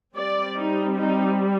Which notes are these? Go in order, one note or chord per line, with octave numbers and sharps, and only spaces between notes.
G3 C4 D5
D#4
D#4